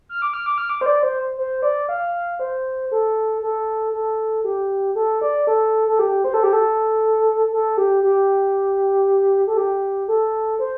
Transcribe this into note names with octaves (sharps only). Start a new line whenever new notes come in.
F6
D6
F6
D6
F6
D6
C5
D5
C5
C5
D5
F5
C5
A4
A4
A4
G4
A4
D5
A4
A4
G4
C5
A4
G4
A4
A4
G4
G4
A4
G4
A4
C5